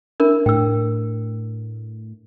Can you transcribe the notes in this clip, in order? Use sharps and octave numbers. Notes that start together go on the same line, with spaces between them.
D4 E4 A#4
A2 G5 E6